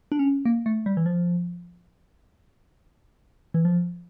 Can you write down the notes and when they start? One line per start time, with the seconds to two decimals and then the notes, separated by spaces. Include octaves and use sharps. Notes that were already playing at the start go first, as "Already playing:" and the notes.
0.12 D4
0.19 C#4
0.45 A#3
0.66 A3
0.86 G3
0.97 E3
1.06 F3
3.54 E3
3.65 F3